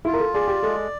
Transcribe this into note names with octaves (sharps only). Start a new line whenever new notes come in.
E4 F4
A#4
A4
G#4 D5
G4
G#3 A4